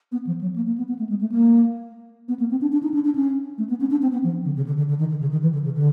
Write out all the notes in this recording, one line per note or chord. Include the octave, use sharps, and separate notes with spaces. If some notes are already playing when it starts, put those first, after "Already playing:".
B3
F3
F#3
A#3
A#3
B3
B3
A3
G#3
A3
A#3
B3
A#3
C4
D4
D4
D#4
D4
D4
C#4
A3
B3
C#4
D4
C4
B3
F3
D3
C#3
D3
D3
D3
D#3
D3
C#3
D#3
E3
D3
C#3
D3